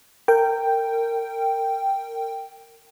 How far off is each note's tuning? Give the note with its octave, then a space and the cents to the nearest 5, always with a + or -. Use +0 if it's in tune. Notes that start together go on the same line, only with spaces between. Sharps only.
A#4 -25 G5 +0